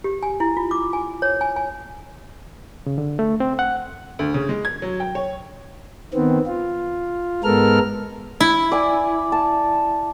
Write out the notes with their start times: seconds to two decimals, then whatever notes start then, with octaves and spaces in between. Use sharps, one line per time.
0.04 G4
0.23 G#5
0.40 E4
0.57 F4
0.71 D6
0.93 G#5
1.22 C#5
1.41 G#5
1.56 G#5
2.86 C#3
2.98 D3
3.19 A3
3.40 C4
3.59 F#5
4.19 D2
4.34 C#3
4.49 G#3
4.65 G#6
4.82 F#3
5.00 G5
5.15 C#5
6.14 D#3 B3 C4
6.46 F4
7.44 G#2 G#3 B3 A4 A#4 F6
8.40 E4
8.72 D5 G#5
9.32 A5